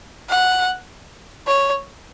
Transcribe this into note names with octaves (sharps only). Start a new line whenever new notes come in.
F#5
C#5